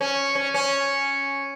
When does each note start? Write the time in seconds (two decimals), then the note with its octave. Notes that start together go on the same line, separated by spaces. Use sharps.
0.01 C#4
0.35 C#4
0.54 C#4